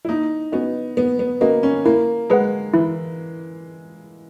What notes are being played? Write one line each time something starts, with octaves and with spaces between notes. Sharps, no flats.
E4
A#3 D#4
B3 C#4 F#4 B4 D#5
A#3 B3
B3
A#3 C#4 F#4 B4 D#5
C#4
A#3 E4
G#3 G#4 B4 F#5
E3 E4